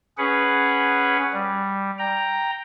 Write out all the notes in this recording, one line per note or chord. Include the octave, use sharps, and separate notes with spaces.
C#4 G#4 B4 F#5
G3
G5 A#5